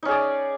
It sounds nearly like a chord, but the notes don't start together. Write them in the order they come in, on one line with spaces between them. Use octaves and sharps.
D#4 C#4 G#4 D5